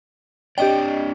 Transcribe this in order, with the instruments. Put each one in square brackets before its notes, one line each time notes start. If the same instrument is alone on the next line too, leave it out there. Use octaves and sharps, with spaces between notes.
[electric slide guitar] C4 D4 D5 [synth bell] G4 D#5 G5